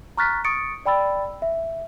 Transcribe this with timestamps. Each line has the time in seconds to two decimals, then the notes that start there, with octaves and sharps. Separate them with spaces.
0.17 A#5 C#6 F6 F#6 A6 B6
0.44 C#6 D#6 A6 C#7 D7
0.86 D5 G5 B5 E6 A6
1.42 E5